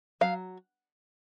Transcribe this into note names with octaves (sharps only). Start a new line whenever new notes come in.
F#3 F5